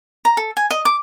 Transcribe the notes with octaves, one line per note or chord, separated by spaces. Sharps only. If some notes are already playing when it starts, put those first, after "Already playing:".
A#5
A4
G#5
D#5
D6